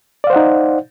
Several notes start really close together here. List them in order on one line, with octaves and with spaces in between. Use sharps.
D5 F5 C5 F#5 D#4